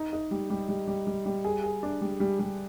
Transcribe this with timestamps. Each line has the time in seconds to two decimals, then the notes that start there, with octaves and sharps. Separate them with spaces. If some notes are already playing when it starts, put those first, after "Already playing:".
Already playing: D#4
0.13 D#4
0.31 G3
0.50 G3
0.69 G3
0.88 G3
1.07 G3
1.26 G3
1.45 G#4
1.64 G#4
1.83 D4
2.01 G3
2.20 G3
2.39 G3